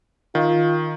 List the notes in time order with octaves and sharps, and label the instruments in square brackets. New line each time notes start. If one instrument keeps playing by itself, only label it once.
[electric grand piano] D#3 [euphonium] F4